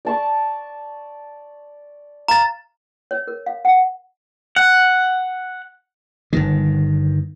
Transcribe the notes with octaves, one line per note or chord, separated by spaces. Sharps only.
D5 A5 C#6
F5 A#5 A6
C#5
A#4
F5
F#5
F#5
G1 D#3